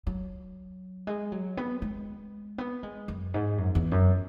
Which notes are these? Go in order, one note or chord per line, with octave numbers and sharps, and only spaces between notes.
F#3
G#3
F#3
B3
G#3
B3
G#3
F#2
G#2
F#2
E2
F#2